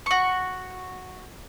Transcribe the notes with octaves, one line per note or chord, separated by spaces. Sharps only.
F#4 C#6